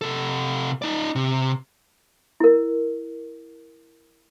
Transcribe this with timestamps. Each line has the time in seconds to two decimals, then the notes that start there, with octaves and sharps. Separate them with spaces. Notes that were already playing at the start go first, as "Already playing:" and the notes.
0.01 C3 A4
0.82 D#4 D5
1.15 C3
2.40 E4 A#4